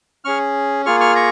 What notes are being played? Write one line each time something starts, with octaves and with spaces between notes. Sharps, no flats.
C#4 G#4 C#6 F6
A#3 F4 G#4 C#6 F6
C#6 F6
A#5 C#6